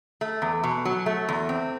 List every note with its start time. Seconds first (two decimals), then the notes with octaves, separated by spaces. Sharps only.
0.21 A3
0.42 E2
0.64 B2
0.85 F#3
1.06 A3
1.29 E2
1.49 C4